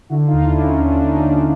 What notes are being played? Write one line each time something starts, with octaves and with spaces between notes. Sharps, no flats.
D3 E4 F#4
D#4 F4
D#2
D4 E4
D3
C#4 D#4
D#2 D4
D4
C#4
D3
D#4
D4
D#2
D4